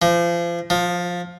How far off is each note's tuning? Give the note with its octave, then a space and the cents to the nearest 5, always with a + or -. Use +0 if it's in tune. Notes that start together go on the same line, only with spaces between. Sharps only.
F3 -30
F3 +15